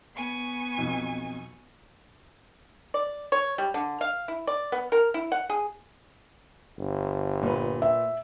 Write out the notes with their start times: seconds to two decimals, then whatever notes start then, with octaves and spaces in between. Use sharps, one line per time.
0.16 B3 G#5 C#6
0.78 B1 F2
2.94 D5
3.32 C#5
3.58 G3
3.74 D3
4.01 F5
4.28 E4
4.47 D5
4.72 B3
4.92 A#4
5.14 E4
5.32 F#5
5.49 G#4
6.79 G1
7.42 A#2 B4
7.82 E5